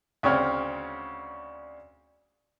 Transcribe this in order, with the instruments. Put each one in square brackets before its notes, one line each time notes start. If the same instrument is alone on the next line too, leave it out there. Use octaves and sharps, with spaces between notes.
[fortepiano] D2 C#3 C4 C#5 F6